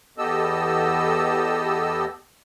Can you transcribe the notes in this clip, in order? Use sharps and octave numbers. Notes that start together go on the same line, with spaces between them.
E2 B3 G4 A4 D#5 E6